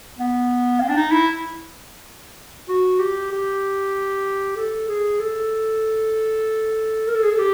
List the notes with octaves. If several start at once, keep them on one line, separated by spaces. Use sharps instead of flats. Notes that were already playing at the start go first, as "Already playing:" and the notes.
B3
C4
D4
D#4
E4
F#4
G4
G4
A4
G#4
A4
A#4
A4
G#4
A4
G4